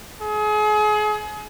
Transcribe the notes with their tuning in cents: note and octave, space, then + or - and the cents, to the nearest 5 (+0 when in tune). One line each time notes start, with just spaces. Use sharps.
G#4 +35